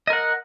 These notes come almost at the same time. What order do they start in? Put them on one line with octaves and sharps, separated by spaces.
D#5 A#4 F#5